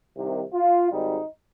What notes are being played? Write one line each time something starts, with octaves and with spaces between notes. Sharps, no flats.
C2 C3 D#3
F4
G#1 G#2 G3 D#4